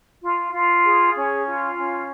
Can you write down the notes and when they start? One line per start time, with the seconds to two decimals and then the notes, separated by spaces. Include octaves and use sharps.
0.22 F4
0.53 F4
0.85 G#4
1.15 C#4
1.46 F4
1.76 C#4